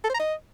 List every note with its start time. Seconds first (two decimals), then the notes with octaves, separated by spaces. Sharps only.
0.04 A4
0.09 C5
0.14 A#5
0.19 D#5